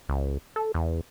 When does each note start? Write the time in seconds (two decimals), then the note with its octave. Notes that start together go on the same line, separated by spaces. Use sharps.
0.09 C#2
0.56 A4
0.74 E2